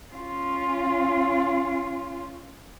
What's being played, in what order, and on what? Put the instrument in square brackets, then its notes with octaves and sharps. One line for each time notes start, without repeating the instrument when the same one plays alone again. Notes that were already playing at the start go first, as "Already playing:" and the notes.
[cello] C#4 F4